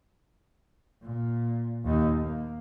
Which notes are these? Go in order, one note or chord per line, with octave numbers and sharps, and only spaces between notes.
A#2
D#2 D#4
A#3